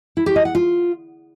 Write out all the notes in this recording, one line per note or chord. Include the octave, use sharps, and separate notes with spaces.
E4
G4
D#5
F#5
F4